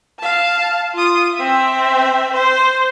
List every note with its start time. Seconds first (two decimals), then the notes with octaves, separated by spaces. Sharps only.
0.19 F5 A5
0.94 F4 D#6
1.35 C4 E5
2.33 C5